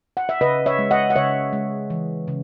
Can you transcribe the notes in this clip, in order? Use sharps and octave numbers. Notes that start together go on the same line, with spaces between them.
F#5
E5
C#3 B4 D#5
C#5 E5
G#3
D#5 F#5
F#5
C#3 C#5 E5
G#3
E3
C#3